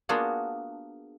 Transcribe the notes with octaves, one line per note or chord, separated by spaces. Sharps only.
A#3 B3 D4 F4 F#4 G#4